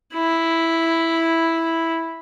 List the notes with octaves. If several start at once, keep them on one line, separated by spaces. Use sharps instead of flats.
E4